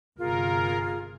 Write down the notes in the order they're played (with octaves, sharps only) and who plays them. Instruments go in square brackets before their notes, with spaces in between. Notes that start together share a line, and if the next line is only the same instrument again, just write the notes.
[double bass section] G1 C3 [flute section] F4 G#4 [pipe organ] A#4